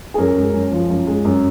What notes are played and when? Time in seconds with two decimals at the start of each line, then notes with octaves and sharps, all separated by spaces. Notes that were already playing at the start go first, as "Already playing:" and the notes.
0.14 G#4
0.18 F#2 A#4
0.36 G#3
0.54 F#2
0.71 F3
0.90 F#2
1.07 G#3
1.25 F#2